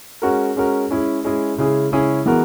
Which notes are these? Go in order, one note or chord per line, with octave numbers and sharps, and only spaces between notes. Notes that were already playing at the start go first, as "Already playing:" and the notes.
G#3 C#4 F#4 A#4
G#3 C#4 F#4 A#4
G#3 C#4 E4 G#4
G#3 C#4 E4 G#4
C#3 G#3 C#4 E4 G#4
C#3 G#3 C#4 E4 G#4
E3 G#3 B3 F#4 A#4